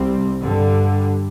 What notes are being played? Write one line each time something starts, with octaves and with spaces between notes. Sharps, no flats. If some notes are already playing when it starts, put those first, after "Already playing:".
Already playing: C2 C3 G3 C4
G2 D3 G3